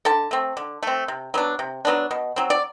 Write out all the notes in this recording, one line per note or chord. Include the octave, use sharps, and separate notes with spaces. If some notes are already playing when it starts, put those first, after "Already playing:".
D3 A4 A5
A3 C4
D3
A3 C4
C3
F#3 B3 D4
C3
F#3 B3 D4
B2
F#3 C4
D5